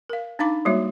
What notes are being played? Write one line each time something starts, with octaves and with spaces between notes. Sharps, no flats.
A#4 F5
D4 D#4 F5 B5 D6
G3 G#3 A#3 F#4 C#5 E5